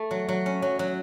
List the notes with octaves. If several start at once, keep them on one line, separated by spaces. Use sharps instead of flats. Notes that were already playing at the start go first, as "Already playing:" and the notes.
Already playing: A3
F#3
F#3
C#4
F#3
F#3